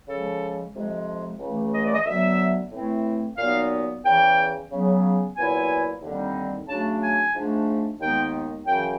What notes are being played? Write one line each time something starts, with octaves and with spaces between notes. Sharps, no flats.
C#3 F3 G#3 A4
F2 C3 F3 G#3
C#2 C#3 E3 A3
D#5
D5
D#5
D2 D3 F#3 B3 E5
A2 E3 A3 C4 E4
A#2 F#3 B3 D#4 F5
E2 C#3 E3 G5
C#3 F#3 B3
A#2 F#3 B3 E4 G#5
D#2 D3 G3 C4 D#4
C#3 F#3 A3 D4 A5
G#5
G#2 F3 A3 D4
D#2 D#3 G#3 B3 D#4 G5
F#2 C#3 E3 G5